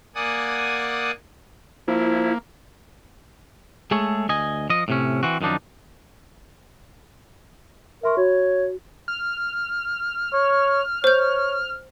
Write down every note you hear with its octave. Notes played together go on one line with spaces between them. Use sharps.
A#3 D5 F#5 G#5 D#6
F3 A#3 E4
G#3 A3 G#4 A4 C#5
D2 D#5 G#5
F3 D#5
A2 C3 C#4
E3 C4 F#4
F#2 D#3 F3 D4 D#4
A#4 E5 C6 C#6
F#4 C#5
F6
C#5
C5 C#5 G6